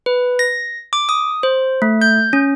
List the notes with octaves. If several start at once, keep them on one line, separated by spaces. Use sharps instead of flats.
B4
A#6
D6
D#6
C5
A3
G6
C#4